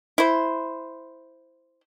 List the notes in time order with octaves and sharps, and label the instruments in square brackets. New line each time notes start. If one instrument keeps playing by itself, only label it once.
[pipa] E4 C5